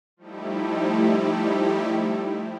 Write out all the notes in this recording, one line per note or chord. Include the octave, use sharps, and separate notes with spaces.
F3 G3 A3 D#4 E4 G4